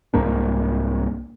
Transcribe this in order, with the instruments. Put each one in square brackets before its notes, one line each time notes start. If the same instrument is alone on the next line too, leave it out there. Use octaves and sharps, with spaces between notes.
[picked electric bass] C2 G#2 A#3 D4